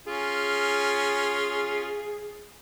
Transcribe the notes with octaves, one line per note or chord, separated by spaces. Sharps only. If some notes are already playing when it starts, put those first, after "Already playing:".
C#4 F4 G#4